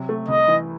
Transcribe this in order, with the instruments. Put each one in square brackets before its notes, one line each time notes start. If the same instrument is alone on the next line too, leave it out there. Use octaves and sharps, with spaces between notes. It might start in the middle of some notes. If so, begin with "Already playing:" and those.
Already playing: [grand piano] C3 F#3
A3
[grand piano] C2 [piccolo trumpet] D#5
[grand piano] E3